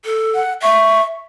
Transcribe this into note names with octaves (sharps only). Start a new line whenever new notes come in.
A4
F#5
E5 C#6